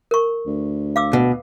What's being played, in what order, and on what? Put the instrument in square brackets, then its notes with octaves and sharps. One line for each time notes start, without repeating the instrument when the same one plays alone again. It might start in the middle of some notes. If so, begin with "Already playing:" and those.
[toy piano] A#4 C#6
[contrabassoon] D2
[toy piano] F5 D6 E6
[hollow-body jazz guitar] B2